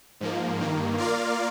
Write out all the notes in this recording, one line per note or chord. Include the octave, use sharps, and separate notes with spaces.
G#2 F3 A#3
G2 D#3 A#3
A#3 F4 A#4 D5 F5